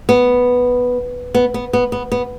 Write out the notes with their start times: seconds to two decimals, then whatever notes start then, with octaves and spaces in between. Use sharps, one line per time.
0.09 B3
1.35 B3
1.54 B3
1.73 B3
1.92 B3
2.12 B3